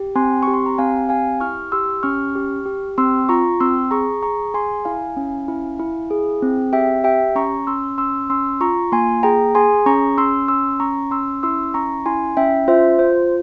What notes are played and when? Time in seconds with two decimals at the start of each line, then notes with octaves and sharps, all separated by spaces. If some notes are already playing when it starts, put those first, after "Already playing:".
Already playing: G4
0.15 C4 G#5 C6
0.43 G4 C#6
0.54 C6
0.66 A#5
0.78 C4 F5 G#5
1.09 G4 F5 G#5
1.40 E4 C#6 F6
1.72 G4 C6 E6
2.03 C#4 C#6 F6
2.35 G4
2.66 G4
2.98 C4 C6 E6
3.29 F4 A#5 C#6
3.60 C4 C6 E6
3.91 G#4 A#5 C#6
4.23 G#4 A#5 C#6
4.54 G#4 G#5 C6
4.85 E4 F5 G#5
5.17 C#4
5.48 E4
5.79 E4
6.11 G#4
6.42 C4
6.73 G4 E5 G5
7.04 G4 E5 G5
7.36 C#4 A#5 C#6
7.67 C#4 C6 E6
7.98 C#4 C6 E6
8.30 C#4 C6 E6
8.61 F4 A#5 C#6
8.92 A#3 G#5 C6
9.23 G#4 G5 A#5
9.55 G#4 G#5 C6
9.86 C#4 A#5 C#6
10.18 C#4 C6 E6
10.48 C#4 C6 E6
10.80 C#4 A#5 C#6
11.11 C#4 C6 E6
11.43 E4 C6 E6
11.74 C#4 A#5 C#6
12.06 E4 G#5 C6
12.37 C#4 E5 G5
12.68 F4 C5 E5
12.99 F4 C5